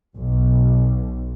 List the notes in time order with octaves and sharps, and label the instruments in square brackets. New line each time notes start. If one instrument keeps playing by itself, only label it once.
[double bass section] B1